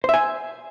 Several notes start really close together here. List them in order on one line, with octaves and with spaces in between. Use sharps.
C5 E5 G#5